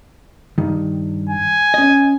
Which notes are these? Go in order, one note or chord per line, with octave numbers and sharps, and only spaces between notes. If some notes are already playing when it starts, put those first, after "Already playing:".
G2 D#3
G#5
C#4 D#5